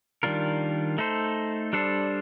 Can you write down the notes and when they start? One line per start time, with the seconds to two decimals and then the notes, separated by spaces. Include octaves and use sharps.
0.23 D#3 G3 D4 F4 A#4
0.98 A3 D#4 A4 C5
1.73 G3 D4 A4 C5